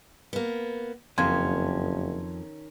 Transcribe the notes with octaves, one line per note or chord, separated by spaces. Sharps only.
A#3 B3
F#1 F2 D#3 C#4 C6 G#6